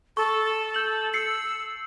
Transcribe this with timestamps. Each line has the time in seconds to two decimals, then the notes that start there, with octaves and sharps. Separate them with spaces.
0.17 A4 C#6
0.74 G6 F#7
1.14 E6 C7 C#7